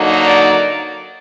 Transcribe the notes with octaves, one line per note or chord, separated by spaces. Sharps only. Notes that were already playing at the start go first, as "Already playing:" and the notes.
Already playing: D3 F#3 A#3 D#4
D5